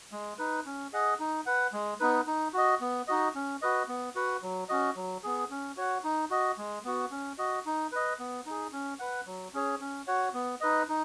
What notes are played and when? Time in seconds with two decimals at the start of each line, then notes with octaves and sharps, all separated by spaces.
0.12 G#3
0.39 D#4 B4
0.66 C#4
0.93 G#4 D#5 F#5
1.19 D#4
1.46 B4 F#5
1.73 G#3
2.00 B3 D#4 B4
2.27 D#4
2.53 F#4 D#5
2.81 B3
3.08 D#4 F#4 D#5
3.35 C#4
3.62 F#4 B4 D#5
3.88 B3
4.15 F#4 B4 F#5
4.43 F#3
4.69 C#4 F#4 D#5
4.96 F#3
5.23 B3 G#4
5.50 C#4
5.77 F#4 C#5 F#5
6.04 D#4
6.30 F#4 D#5
6.58 G#3
6.84 B3 F#4
7.11 C#4
7.38 F#4 D#5
7.66 D#4
7.92 B4 D#5
8.19 B3
8.46 D#4 G#4
8.72 C#4
8.99 B4 F#5
9.27 F#3
9.54 C#4 G#4 C#5
9.80 C#4
10.07 F#4 C#5 F#5
10.34 B3
10.61 D#4 B4 D#5
10.89 D#4